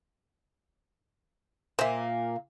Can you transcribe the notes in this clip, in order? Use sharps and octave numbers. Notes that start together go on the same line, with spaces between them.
A#2 A#3 C5 E5